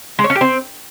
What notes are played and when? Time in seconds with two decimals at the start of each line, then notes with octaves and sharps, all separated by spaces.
0.19 G#3
0.24 C#5
0.30 C#4
0.35 G4
0.41 C4